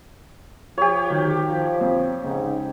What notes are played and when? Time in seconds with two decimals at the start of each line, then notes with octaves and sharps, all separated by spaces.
0.78 F3 F4 G4 C#5
1.10 D#3 F#3
1.48 F3
1.81 F2
2.23 G#2 C#3 D#4